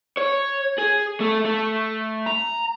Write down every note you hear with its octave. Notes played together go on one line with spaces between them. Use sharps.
C#5
G#4
A3
A3
A#5